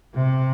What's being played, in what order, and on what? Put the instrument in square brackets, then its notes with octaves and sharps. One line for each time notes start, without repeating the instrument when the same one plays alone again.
[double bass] C3